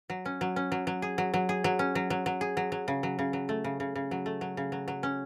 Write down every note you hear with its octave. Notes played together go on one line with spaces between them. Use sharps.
F#3
C#4
F#3
C#4
F#3
F#3
G#4
F#3
F#3
G#4
F#3
C#4
F#3
F#3
F#3
G#4
F#3
F#3
C#3
F#3
C#3
F#3
A3
C#3
C#3
C#3
F#3
A3
F#3
C#3
F#3
F#3
C#4